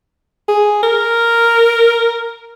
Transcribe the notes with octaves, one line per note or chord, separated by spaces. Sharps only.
G#4
A#4